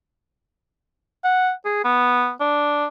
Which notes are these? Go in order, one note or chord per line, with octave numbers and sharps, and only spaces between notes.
F#5
G#4
B3
D4